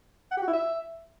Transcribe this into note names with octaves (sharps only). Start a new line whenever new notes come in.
F#5
G4
F#4
E4
E5